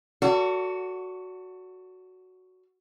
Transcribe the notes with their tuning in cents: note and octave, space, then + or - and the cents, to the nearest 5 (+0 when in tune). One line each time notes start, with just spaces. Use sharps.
F#4 +0 A4 +30 D5 -40